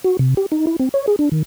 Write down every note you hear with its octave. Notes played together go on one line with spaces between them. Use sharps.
F#4
C3
G4
D#4
E4
C4
C#5
G#4
D4
D#3